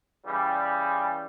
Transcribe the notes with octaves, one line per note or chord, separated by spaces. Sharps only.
C#3 E3 G3